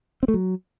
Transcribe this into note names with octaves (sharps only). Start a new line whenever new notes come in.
C4
A3
F#3